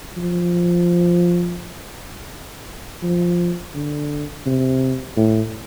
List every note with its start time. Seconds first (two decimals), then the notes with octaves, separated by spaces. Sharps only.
0.17 F3
3.03 F3
3.75 D3
4.46 C3
5.17 A2